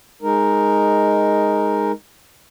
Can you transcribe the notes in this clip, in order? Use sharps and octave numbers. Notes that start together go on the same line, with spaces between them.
G#3 D#4 A#4